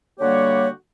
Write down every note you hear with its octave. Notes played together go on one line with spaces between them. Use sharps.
D3 G3 A#3 F#4 G4 C#5